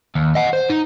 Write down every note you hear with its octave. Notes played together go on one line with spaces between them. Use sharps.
D#2
D#5 F#5
C5
D#4